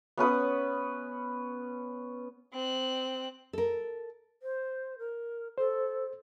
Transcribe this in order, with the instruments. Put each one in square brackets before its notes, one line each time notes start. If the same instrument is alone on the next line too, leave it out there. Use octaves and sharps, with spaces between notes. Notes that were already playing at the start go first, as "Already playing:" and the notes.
[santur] B3 C#4 B4 D#6
[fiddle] C4 F#6
[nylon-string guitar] A4 A#4
[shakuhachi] C5
A#4
[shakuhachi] A4 [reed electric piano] C5